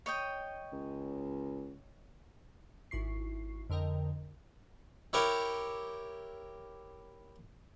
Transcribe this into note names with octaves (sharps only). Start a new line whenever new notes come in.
C#5 D#5 G5
C#2
G#1 E4 C#6 C7
F2 D3 A#4 D#5 G5
E4 G4 A#4 C#5 E5